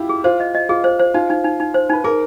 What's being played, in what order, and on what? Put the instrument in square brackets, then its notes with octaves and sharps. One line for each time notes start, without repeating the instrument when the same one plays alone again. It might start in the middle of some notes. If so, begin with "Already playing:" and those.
Already playing: [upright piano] E4 F4 G4
[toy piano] G#4
[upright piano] F4 [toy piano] C5
[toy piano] D#5
D#5
[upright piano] F4 [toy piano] G#4
[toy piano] C5
C5
[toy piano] D#4 [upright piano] F4
[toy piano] D#4
D#4
D#4
C5
[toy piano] D#4 [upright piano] B4
[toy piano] G#4 [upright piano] A#4